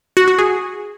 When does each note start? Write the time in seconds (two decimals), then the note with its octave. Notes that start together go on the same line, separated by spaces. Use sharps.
0.17 F#4
0.28 F#4
0.38 G#4